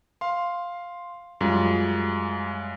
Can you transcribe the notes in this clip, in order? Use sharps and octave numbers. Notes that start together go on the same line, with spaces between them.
F5 C6
F#2 G3 G#3 F4